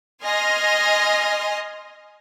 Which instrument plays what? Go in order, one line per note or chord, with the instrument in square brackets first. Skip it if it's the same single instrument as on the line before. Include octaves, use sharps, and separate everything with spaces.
[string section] D#5 G#5 C6 F6 A#6